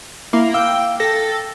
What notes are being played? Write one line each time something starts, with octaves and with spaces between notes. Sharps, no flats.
A#3 E4
F5 G5 D6 E6
A4 G5 A#6